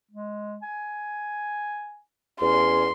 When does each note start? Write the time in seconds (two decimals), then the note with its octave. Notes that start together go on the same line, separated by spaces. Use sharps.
0.11 G#3
0.62 G#5
2.42 E2 C#4 C6